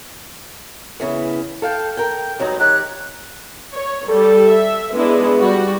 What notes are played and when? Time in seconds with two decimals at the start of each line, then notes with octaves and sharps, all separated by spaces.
1.00 C#3 E3 B3
1.62 A4 F5 G5
1.97 A#4 G5
2.39 G2 F#3 D#4
2.59 D#3 G4 C#5 A#5 F#6
3.73 C#5
4.09 G3 A4
4.46 E5
4.94 G#3 B3 D4 E4
5.39 G3 F#4